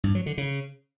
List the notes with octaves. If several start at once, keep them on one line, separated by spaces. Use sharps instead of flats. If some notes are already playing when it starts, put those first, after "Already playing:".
G2
F#3
D3
C#3